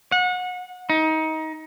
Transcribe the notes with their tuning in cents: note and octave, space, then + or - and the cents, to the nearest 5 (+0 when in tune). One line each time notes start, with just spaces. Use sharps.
F#5 -30
D#4 +25